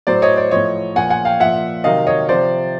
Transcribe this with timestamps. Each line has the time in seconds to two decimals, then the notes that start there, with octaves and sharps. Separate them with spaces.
0.07 A2 F#3 C5 D5
0.22 C#5 D#5
0.36 C5 D5
0.51 A2 F3 C#5 D#5
0.96 A#2 F3 F#5 G#5
1.10 F#5 G#5
1.25 F5 G5
1.40 A#2 F3 E5 F#5
1.84 C3 D#3 F#3 D#5 F5
2.07 C#5 D#5
2.29 C3 F3 C5 D5